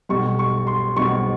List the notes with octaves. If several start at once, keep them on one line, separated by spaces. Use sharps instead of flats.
B1 B2 G3 C#6
C#6
C6
B1 B2 G3 C#6